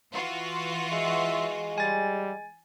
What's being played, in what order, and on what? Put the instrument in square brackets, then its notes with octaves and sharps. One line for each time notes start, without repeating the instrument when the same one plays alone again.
[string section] E3 F4 F#4
[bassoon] G#3 [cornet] E5
[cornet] G3 [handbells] G#5 A6